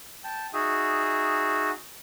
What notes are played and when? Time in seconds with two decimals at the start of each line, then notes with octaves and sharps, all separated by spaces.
0.24 G5 A5
0.53 D#4 F#4 G#4 E5 D#6